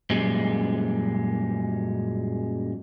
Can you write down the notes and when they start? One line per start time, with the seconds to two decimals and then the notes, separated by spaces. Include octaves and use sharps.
0.10 F#2 A#2 G3 G#3